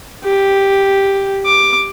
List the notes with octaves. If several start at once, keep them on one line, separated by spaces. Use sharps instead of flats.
G4
D6